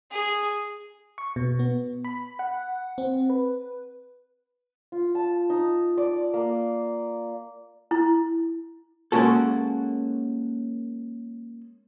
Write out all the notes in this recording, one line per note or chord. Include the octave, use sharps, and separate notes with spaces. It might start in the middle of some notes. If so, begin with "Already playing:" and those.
G#4
C#6
B2
B3
B5
F#5
C4
B4
F4
A5
D#4
D5
A#3
E4
G#3 A#3 C#4 F#4 A4